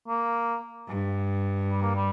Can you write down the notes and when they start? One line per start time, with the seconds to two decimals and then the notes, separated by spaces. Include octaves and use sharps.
0.08 A#3
0.89 G2
1.70 G3
1.82 A#3
1.96 G3